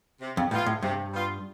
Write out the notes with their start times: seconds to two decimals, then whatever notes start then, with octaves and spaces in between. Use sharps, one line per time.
0.21 C3
0.37 F2
0.51 A2 G3 B3 F4
0.66 A2
0.82 G2 C3
1.12 G3 B3 F4